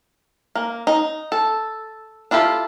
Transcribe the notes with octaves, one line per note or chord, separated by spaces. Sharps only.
A#3
D#4
A4
D4 E4 F4 G4 A4